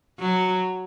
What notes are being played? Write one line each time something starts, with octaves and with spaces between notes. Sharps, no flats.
F#3